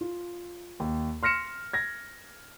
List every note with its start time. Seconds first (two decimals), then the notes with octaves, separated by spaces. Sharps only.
0.01 F4
0.80 D#2
1.23 C6 F6 A#6 C#7 E7
1.73 G#6 A#6